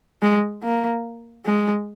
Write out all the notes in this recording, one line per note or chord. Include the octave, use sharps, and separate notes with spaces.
G#3
A#3
G#3